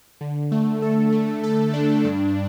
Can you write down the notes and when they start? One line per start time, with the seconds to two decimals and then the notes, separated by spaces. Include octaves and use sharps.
0.21 D3
0.52 A3
0.82 A4
1.12 A3
1.43 A4
1.73 D4
2.04 G2